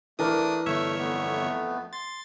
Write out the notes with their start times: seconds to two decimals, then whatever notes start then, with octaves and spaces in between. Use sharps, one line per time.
0.19 E3 A3 D4 A#4 D#6
0.66 G1 A3 C#5 E5 E6
0.99 F2 A3 B3
1.93 C6 A6